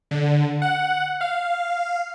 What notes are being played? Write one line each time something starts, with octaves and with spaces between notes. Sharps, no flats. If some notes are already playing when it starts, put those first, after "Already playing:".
D3
F#5
F5